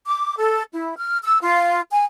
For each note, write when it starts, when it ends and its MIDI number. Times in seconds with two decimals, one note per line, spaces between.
0.07 0.36 86
0.38 0.63 69
0.72 0.97 64
0.97 1.18 89
1.23 1.38 88
1.41 1.80 65
1.90 2.03 80